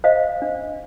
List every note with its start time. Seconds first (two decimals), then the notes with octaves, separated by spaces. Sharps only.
0.04 C5 D#5 F5
0.42 D4